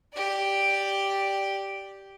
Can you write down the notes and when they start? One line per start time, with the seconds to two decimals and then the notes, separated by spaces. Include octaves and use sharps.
0.13 G4 D5